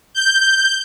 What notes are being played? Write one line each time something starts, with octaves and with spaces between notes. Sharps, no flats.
G6